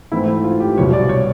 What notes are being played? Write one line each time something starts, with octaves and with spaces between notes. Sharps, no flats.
G#2 E3 A3 C4 E4
E4
F4
G4
C2 B2 F#3 C#5
D5
C#5